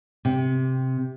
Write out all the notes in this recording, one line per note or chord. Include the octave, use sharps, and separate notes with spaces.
C3